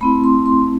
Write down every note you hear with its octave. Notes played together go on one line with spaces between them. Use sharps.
A3 C4 E4 B5
C6
C6